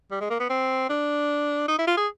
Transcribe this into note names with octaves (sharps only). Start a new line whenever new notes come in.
G3
G#3
A#3
B3
C4
D4
D#4
E4
F4
G#4